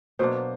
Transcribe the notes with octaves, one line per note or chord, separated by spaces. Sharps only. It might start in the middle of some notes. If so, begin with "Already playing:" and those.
B2 F#3 A#3 D4 C5